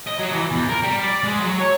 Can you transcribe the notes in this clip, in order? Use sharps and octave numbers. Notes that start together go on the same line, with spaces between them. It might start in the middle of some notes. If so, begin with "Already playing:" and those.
D#5
F#3
E3
E2
A#4
G3
D5
G#3
F#3
C#5